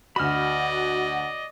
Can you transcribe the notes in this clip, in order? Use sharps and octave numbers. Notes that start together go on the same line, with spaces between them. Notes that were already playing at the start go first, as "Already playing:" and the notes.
D2 F#4 D5 D#5 B5 F6 E7